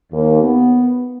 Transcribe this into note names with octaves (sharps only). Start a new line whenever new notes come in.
D#2
B3